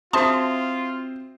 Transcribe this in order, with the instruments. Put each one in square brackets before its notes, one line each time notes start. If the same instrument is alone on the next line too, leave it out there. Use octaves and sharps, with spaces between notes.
[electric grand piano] C4 C5 [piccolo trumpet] F4 [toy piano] F#4 E5 D#6 [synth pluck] A5 C6